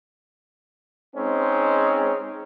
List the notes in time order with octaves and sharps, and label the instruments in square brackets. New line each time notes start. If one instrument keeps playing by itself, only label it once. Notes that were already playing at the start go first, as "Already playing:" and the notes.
[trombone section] G#3 C4 C#4 D#4